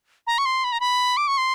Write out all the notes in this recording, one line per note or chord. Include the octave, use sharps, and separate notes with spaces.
A#5
C#6
C6
B5
A#5
B5
D6
C#6
C6